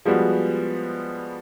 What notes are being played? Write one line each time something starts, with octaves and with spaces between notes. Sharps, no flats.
F3 G3 G#3 B3 F#4